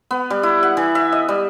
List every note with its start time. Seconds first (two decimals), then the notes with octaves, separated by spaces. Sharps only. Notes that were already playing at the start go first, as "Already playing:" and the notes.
0.11 B3
0.30 G3
0.43 E4
0.63 F#5
0.77 E3
0.95 E5
1.12 D#5
1.29 G3